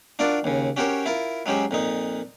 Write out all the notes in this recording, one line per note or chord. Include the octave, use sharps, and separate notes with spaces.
D4 F4 F#4 A#4 D5
D#2 C#3
C#4 F#4 G4 A#4 C5 C#5
E4 F4 A#4
F#3 G#3 C#4 G4 C5
F2 A#2 D#4